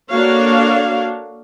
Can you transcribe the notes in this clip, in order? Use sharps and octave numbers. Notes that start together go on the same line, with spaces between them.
A#3 D4 F#4 A4 C#5 F5